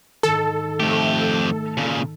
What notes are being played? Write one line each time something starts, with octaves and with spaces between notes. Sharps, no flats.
G#2 D#3 A4
F2 A3 G4
A#2 C#3